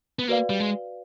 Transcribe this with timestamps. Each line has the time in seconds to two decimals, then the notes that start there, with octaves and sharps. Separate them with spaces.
0.19 B3
0.28 A#3 F#4 B4 D5 F5
0.50 G3
0.60 G#3